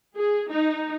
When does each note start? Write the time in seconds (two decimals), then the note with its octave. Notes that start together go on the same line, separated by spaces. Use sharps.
0.17 G#4
0.49 D#4